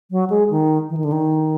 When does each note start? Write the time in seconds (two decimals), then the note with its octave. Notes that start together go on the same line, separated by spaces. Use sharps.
0.11 F#3
0.30 G#3
0.50 D#3
0.89 E3
0.97 D#3
1.04 D3
1.12 D#3